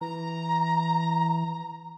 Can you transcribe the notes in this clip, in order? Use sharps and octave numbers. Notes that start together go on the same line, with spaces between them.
E3 A#5